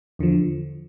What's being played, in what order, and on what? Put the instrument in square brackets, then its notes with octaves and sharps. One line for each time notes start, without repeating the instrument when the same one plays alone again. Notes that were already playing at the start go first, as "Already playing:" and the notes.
[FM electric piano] E2 D3 F3